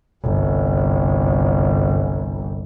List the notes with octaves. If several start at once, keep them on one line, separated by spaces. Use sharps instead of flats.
G1 C2